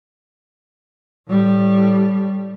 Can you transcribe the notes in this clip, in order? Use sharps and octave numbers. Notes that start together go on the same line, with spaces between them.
A2 G3